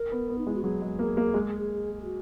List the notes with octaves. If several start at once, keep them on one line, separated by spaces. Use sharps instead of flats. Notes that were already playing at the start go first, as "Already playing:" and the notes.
Already playing: A#4
B3
B3
D#4
G#3 E4
F#4
F#3 G#4
G#3
A#3
A#3
G#3
G#4
F#4